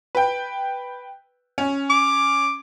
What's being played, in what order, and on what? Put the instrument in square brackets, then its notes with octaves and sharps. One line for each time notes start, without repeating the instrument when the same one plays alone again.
[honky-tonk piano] B4 G5
C#4
[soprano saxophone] D6